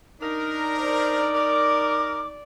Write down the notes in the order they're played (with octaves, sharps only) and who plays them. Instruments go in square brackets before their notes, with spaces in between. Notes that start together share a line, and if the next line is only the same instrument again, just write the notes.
[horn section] D4 A#4 [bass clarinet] D#4
[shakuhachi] C5 [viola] D5
[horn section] A#4 [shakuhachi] D6